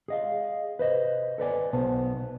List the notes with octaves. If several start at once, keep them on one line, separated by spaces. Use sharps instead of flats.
G#4 D#5 F5
B4 C5 D#5
A4 B4 D5 G#5
B1 B3 C5 A5